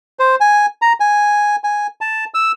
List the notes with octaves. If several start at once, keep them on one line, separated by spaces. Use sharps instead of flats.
C5
G#5
A#5
G#5
G#5
A5
E6